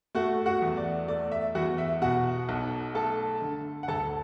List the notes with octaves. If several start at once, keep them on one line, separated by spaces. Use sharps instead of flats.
A3 F#4 F#5
F#4 F#5
E2
D5
A3 D5
E5
E2 F#4 F#5
E5
B2 F#4 F#5
B1
A3 A4 A5
D3
F#5
D2 A4 A5